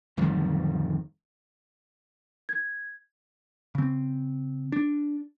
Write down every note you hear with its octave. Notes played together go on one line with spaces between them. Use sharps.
D1 F2 D#3 G3
G#6
C#3 C4
D4